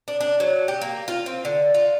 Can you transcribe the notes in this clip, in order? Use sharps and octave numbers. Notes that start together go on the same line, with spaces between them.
D4
D4
F#3
G4
A#3
F4
C4
D3
F4